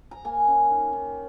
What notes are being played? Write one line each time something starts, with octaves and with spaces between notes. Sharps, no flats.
A#5
A#3 G#5
C#4
D#3
D#3